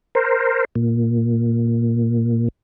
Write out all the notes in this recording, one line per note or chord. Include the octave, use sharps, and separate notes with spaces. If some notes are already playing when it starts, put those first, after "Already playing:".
A#4 C5
A#2